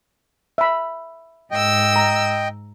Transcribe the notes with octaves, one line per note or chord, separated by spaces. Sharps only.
E5 B5
G#2 D#5 G5 E6
A#5